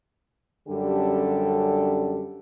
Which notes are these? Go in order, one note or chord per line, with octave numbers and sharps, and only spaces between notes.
F#2 D3 G3 C#4 G4 A4